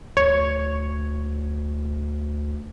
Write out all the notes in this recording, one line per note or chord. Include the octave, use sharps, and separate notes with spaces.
D2 C#5